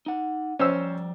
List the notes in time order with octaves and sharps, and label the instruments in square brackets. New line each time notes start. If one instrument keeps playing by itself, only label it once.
[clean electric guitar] D#4 F#5
[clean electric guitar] F3 G3 D5 [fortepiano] C#4 C5 E6